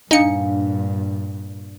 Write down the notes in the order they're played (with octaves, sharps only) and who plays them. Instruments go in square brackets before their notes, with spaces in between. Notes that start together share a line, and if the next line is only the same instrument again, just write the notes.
[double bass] G2 A#2 [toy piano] D4 F5 [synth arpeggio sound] D#4 C#7